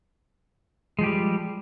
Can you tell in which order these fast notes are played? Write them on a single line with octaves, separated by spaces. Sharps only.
G#3 F3 G4 G3